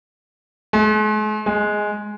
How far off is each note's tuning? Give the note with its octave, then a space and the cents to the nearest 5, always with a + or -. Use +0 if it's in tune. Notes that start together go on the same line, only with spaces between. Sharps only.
G#3 +45
G#3 +5